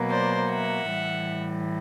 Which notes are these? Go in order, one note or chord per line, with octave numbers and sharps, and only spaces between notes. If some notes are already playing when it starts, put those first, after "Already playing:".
Already playing: B2 F#3 A#3
C5 D5
E5 F#5
A2 E3 G3